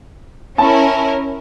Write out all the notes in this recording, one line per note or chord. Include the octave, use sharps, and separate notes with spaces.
C#4 E4 A#4 A5